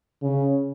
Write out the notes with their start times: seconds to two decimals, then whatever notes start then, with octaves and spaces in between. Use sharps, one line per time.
0.22 C#3